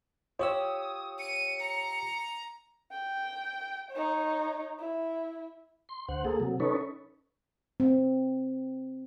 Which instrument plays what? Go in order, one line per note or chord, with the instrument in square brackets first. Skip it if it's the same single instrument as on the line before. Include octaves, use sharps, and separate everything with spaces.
[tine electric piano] F4 G4 E6 [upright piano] C#5 [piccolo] D#6
[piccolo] C#7 [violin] D#7
[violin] A#5
[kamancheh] G5
D#4 C#5
E4
[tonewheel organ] C6
D2 C5 F#5
A#3 G#4 A4
C3 F#3
C#4 D#4 A4 B4 C#5
[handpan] C4